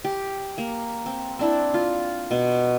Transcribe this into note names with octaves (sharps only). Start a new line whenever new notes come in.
G4
A#3
C4
C4 D4 E4
F4
B2